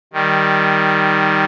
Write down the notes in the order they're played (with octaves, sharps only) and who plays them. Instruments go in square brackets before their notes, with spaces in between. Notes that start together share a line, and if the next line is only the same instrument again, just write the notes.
[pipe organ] D#3 G3